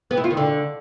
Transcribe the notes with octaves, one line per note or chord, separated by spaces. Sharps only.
B3
E4
F4
D#3
D3